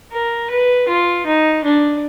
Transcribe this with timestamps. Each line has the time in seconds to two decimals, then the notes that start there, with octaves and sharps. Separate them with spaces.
0.12 A#4
0.50 B4
0.88 F4
1.26 D#4
1.64 D4